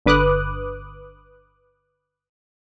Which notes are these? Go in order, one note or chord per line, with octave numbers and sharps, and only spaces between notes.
G1 D3 B4 D6 D#6 F#6